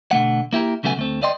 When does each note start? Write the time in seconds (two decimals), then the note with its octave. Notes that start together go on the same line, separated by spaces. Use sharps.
0.11 B2 D3 A3 F#5
0.53 A#3 E4 G4 A#4
0.83 B1 C#3 F#3 A3 B3 G#5
0.97 D2 A3 C4
1.22 B4 D5 D#5 G5 C6